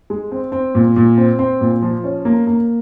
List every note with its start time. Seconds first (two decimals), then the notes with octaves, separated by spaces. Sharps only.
0.10 G#3
0.32 C4
0.52 C4
0.75 A#2
0.96 A#2
1.18 C4
1.39 C4
1.61 A#2
1.82 F3
2.04 C#4
2.25 A#3
2.47 A#3